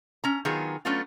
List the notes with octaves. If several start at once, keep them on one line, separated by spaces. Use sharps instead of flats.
C#4 A#5
D#3 F#3 B3 F4 G#4
F#3 A3 B3 C#4 D4 F4